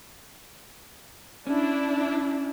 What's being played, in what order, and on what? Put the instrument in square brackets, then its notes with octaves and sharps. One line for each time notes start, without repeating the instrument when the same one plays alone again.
[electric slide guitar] C#4 [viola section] D4 E4